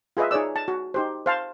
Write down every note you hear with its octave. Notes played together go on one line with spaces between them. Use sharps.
F4 G#4 B4 D#5 E5
D#4 G#4 C#5 D5 E6
A5
F#4
D#4 G4 C5
C5 F5 A5